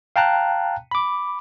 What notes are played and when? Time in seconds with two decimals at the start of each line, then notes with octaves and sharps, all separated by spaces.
0.16 F5 G5 A5 A#5 F#6
0.91 B5 D6